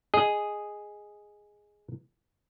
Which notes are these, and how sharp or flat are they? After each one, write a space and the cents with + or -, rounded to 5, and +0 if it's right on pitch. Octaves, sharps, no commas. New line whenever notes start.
G#4 +0 D#5 +0